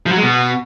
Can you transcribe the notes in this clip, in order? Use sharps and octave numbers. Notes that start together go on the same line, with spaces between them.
F3
F#3
G#3
B2